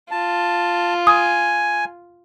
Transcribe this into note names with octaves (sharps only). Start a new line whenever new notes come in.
F4 A5
G#5 D#6